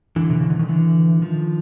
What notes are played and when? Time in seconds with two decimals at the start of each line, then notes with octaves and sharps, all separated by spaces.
0.16 D3 E3
0.30 C3
0.40 C#3
0.50 D3
0.59 D#3
0.69 D3 E3
1.22 D#3 F3